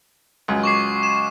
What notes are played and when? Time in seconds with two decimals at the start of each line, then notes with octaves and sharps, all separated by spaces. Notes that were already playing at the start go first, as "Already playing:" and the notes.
0.48 C#2 F#2 F#3
0.63 C#6 D6 C7
1.03 E7